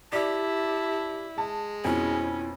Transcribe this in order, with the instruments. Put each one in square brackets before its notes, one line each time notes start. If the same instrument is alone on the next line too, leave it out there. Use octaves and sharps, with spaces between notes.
[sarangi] E4 [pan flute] G4 [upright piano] D5 [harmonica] A5
[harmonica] G#3 [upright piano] A5
[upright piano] F2 B2 G#5 [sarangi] C#4 [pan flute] E4